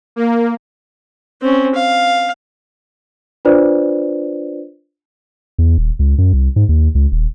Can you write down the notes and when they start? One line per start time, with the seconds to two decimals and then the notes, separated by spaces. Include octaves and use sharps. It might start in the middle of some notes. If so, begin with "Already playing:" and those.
0.16 A#3
1.42 C4 C#4
1.75 F5
3.45 D4 F4 B4 C5 D5
5.59 E2
5.78 D#1
5.99 C#2
6.18 F#2
6.33 C2
6.56 G#2
6.69 D#2
6.95 C#2
7.12 D#1